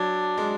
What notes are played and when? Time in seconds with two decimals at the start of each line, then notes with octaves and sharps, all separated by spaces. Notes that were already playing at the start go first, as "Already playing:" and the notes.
Already playing: F#3 D4
0.38 G#3